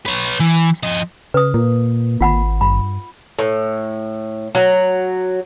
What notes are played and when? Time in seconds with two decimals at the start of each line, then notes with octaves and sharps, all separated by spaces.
0.06 B4 C#5
0.40 E3
0.83 F3 D#5
1.34 C#3 B4 D#6
1.54 A#2 A#3
2.21 G#1 F4 F#5 B5
2.61 G2 B5
3.39 A2
4.55 F#3